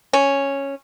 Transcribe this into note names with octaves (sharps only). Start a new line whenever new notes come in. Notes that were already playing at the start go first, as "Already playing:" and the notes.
C#4